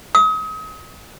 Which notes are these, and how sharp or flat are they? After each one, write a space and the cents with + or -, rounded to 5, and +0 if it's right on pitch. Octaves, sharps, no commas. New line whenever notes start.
D#6 +35